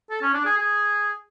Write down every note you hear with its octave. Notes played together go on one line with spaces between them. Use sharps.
A4
C#4
D4
G#4
G#4